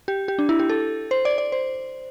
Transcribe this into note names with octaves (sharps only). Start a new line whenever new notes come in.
G4
G4
D4
E4
G4
A4
C5
D5
D5
C5